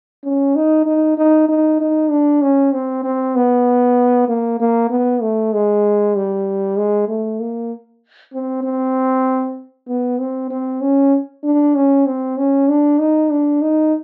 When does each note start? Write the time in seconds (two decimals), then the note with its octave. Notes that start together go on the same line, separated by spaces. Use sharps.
0.24 C#4
0.56 D#4
0.86 D#4
1.18 D#4
1.49 D#4
1.80 D#4
2.11 D4
2.42 C#4
2.73 C4
3.04 C4
3.36 B3
4.29 A#3
4.60 A#3
4.90 B3
5.22 A3
5.53 G#3
6.16 G3
6.77 G#3
7.08 A3
7.40 A#3
8.34 C4
8.64 C4
9.88 B3
10.20 C4
10.50 C4
10.81 C#4
11.44 D4
11.76 C#4
12.06 C4
12.38 C#4
12.69 D4
12.99 D#4
13.31 D4
13.62 D#4